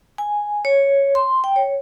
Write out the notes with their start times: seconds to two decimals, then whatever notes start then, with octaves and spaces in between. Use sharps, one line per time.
0.18 G#5
0.65 C#5
1.15 C6
1.44 G5
1.56 C#5